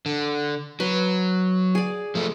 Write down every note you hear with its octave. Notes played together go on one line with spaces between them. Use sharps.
D3
F#3 B4
G#4 D5
F3 A3